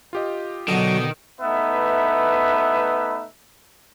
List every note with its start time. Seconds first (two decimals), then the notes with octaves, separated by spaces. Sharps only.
0.13 F4 G4 D#5
0.68 B2 D3 D#3 F#3
1.41 A3 B3 D#4 B4 E5